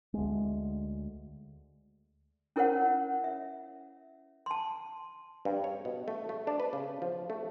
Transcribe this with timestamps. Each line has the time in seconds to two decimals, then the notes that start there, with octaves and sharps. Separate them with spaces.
0.14 D2 G#3
2.56 C#4 E4 A#4 C5 C#5 F#5
3.24 E5
4.46 A5 C6
5.45 G2
5.64 C#5
5.85 B2
6.08 A3
6.29 A3
6.47 D4
6.60 B4
6.73 C#3
7.02 F3
7.30 A3